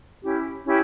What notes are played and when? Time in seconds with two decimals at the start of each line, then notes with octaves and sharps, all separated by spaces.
0.22 C#4 E4 G4
0.65 C#4 E4 G4